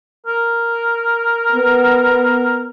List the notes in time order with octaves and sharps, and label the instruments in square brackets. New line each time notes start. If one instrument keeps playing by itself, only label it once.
[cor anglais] A#4
[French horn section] B3